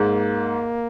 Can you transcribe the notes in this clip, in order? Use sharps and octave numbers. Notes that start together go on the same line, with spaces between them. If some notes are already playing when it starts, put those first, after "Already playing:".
Already playing: G#2 A#3